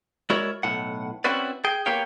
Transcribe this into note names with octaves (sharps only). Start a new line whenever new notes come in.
G#3 E4 F#4 A#4 C#5 D5
B1 A2 F#5
C4 C#4 E4 F#4 B4 D5
G#4 G5
A#3 B3 G4 C#5 F5 G5